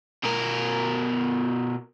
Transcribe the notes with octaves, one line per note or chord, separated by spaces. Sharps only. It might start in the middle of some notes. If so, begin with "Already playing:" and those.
B2 A#4